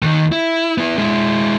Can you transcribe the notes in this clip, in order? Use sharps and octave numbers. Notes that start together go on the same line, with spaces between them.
D#2 D#3
E4
B3 E4
G#3 E4